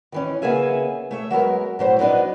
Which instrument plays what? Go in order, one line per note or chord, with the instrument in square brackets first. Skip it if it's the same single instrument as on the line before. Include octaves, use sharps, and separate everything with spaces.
[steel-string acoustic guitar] D#3 E3 C#4
C#3 A#3 B3 G#4 E5 G#5
A3 C#5 E5
F#3 G#3 B3 A#4
A2 F#3 C5
F#3 B3 C4 D4 D#4